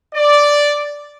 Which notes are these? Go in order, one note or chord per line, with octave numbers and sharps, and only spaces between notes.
D5